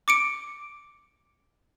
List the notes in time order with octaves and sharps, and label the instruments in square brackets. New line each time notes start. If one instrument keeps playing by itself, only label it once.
[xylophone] D6 C#7 D7